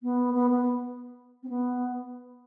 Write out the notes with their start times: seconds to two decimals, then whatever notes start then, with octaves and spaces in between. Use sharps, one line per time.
0.02 B3
0.34 B3
0.50 B3
1.42 C4
1.49 B3